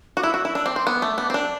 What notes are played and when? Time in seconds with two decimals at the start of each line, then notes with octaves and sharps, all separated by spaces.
0.17 F#4 D6
0.23 E4 E6
0.34 F#4
0.45 E4
0.55 D4 E6
0.66 C4 D6
0.76 C4 C6
0.87 B3 D6
1.02 A3
1.18 B3
1.30 C4
1.34 D4